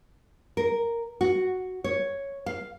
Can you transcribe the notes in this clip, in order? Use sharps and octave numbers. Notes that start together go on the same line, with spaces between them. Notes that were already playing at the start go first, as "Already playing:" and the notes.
A#4
F#4
C#5
F5